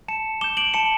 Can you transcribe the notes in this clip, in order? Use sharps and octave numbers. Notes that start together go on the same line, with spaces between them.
A5 C#7 E7
D6 G6 E7 G7
D7 F#7
A5 C#7 E7